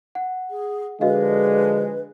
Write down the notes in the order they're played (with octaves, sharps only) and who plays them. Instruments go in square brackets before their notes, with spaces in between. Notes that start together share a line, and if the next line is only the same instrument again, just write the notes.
[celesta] F#5
[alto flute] G#4
[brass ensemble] D3 F3 G#3 [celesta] F#4 D#5 F5 [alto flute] B4